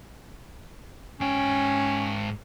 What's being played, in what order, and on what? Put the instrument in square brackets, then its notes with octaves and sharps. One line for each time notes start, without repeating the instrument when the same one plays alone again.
[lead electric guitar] G#2 G5 [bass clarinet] C#4